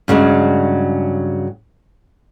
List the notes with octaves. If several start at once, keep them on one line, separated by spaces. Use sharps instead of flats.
G2 C#3 F#3 G#3 D4